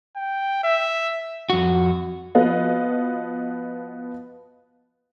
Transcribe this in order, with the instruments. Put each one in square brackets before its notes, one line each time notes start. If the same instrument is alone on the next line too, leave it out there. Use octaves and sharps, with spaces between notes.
[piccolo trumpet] G5
E5
[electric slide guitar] F2 F#4
[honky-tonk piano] F3 B3 F#4 B4 D#5 F5